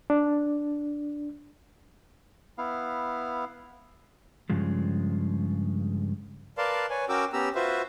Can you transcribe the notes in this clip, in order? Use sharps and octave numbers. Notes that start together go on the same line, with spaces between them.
D4
B3 E4 F5
G2 C#3 F3 G#3
A#4 B4 D5 F5 A5 C6
B4 C#5 G#5
C#4 F#4 A#4 G5 D6 E6
B3 C#4 G4 A#5 E6
F4 F#4 B4 C5 E5